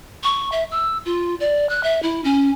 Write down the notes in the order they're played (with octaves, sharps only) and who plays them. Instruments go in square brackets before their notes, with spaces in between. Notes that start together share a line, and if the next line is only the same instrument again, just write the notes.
[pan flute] C#6
E5
E6
F4
D5
F#6
E5
E4
C#4